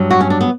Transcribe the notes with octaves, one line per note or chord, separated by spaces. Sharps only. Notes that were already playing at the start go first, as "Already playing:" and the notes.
Already playing: G2 F#3
F#4
C#4
D4
B3